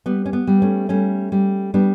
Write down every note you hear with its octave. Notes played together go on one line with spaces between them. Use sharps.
G3 B3
C#4
B3
G3
A3 C#4
G3 A3 C#4
G3
G3 B3 D4